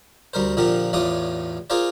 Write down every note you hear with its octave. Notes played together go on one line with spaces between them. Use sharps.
D2 G3 A#4 C5
A#2 D3 F3 G4 A#4
A1 E2 A2 F4 D5 D#6
F4 G#4 A#4 C5 D5